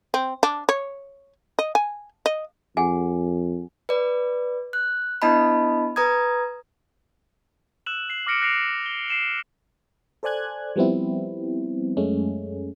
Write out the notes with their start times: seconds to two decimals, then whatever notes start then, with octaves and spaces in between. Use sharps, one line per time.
0.14 C4
0.43 D4
0.69 C#5
1.59 D#5
1.75 G#5
2.26 D#5
2.77 F2 G#4 F#5 G#5
3.89 B4 D5
4.73 F#6
5.22 B3 D4 E4 D#5 A5 B5
5.96 B4 A#5 D#6 G#6
7.86 E6 F#6 E7 F#7
8.10 C7 F#7
8.27 D6 F6 A#6 C#7 D7
8.42 F#6 A#6 C7 D7 F7
8.86 G7
9.08 C7 E7 F#7
10.23 A4 C5 D5 G#5 F#6 G#6
10.76 F3 G3 B3 C4 E4
11.97 F#2 G#3 A3 C#4